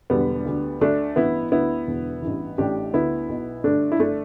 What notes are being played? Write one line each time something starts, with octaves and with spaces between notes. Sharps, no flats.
E1 E2 D3 G3 B3
D2 D3
D2 D3 A3 D4
A1 G2 E3 B3 E4
D2 D3 B3 E4
E1 E2 D3
A1 G2 E3
A1 A2 E3 D4 G4
D2 D3 B3 E4
B1 B2
G1 G2 D3 A3 D4
E4
G1 D3 A3 D4